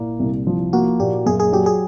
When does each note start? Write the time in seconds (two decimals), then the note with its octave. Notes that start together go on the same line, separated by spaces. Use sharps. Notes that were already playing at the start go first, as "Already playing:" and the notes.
Already playing: A#2 A#3 E4
0.19 C2
0.47 F3
0.73 A#3 F#4
1.00 A#2 G4
1.26 F#2 G#4
1.40 G#4
1.52 F#3 G4
1.66 G#4